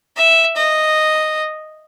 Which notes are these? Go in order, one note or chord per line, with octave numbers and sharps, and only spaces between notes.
E5
D#5